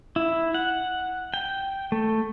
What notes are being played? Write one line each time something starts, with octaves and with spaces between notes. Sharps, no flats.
E4
F#5
G5
A3